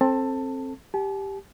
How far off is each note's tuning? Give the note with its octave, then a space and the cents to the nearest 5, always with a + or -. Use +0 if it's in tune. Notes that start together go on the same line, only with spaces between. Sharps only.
C4 +20 A4 +0 A5 +15
G4 +0 A5 -45